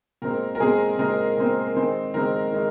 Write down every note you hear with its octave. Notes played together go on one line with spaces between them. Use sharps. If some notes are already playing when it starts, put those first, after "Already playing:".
A#2 G#3 C4 A#4
A#4
A#2 G#3 C4 G#4
A#2 G#3 C4 A#4
A#2 G#3 C4
D#3 G#3 C4
D#3 G#3 C4 A#4
D#3 G#3